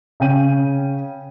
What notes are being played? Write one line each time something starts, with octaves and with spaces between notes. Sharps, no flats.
C#3 C#4 G5 D#7